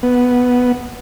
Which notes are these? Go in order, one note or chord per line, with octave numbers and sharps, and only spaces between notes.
B3